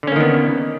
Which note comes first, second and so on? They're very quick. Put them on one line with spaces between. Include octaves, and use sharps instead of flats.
D3 C#4 A#3 D#3 B3